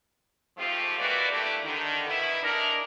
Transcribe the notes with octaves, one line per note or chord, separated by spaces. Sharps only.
G#2 F3 A3 C4 F4 G4
G#3 A#3 E4 F#4 B4 D5
G3 A3 D4 E4 G4
D3 D#3
B2 E4
G#3 D4 D#4 A#4